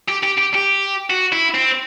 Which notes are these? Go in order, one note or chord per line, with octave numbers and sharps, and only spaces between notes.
G4
G4
G4
G4
F#4
E4
C4